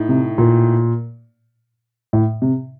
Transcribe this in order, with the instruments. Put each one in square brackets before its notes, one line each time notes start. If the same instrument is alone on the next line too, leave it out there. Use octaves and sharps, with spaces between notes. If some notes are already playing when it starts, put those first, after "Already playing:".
Already playing: [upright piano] A2 D#4
[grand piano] C3
A#2
A2
C3